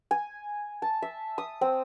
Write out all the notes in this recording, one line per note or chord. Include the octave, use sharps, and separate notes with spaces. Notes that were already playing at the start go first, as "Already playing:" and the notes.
G#5
A5
E5
D#6
C4